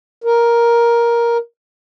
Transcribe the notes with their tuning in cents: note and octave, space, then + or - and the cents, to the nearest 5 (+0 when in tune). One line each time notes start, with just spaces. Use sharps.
A#4 +10